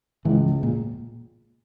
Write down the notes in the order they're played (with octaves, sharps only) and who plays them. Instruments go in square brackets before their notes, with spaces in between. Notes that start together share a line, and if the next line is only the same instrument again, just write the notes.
[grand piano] C#2 C#3 G#3 [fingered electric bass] E3
[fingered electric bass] A#2